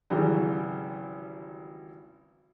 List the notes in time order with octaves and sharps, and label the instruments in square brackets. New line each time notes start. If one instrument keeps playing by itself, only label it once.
[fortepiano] G#1 C#3 E3 F#3 G3